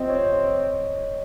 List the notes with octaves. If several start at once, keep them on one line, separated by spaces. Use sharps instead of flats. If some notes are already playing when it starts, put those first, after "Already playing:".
Already playing: F2 C3 F3 C4 D#5
C#5